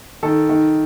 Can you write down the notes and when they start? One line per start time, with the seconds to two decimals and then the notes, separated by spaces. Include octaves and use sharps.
0.23 D#3 A4
0.49 D#3